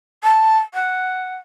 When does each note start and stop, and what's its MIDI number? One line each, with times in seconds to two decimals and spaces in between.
0.23 0.57 81
0.73 1.36 78